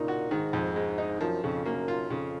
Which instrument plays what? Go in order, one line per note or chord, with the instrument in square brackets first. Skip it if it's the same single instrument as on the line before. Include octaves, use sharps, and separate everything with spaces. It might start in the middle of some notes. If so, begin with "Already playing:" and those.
Already playing: [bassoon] A#2 [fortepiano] C#3 D#4
[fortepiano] F#4
[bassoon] G#2 [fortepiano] D#3
[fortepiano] F2
G#3
D#4
[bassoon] F#2 [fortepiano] F3
[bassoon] F2 [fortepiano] C#3
[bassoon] F#2 [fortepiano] A#3
[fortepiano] F4
[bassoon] F2 [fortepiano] C#3